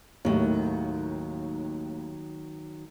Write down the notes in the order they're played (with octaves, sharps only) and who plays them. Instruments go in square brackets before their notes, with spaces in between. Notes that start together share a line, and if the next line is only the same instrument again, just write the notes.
[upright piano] D#2 A2 [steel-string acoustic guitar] D#3 F#3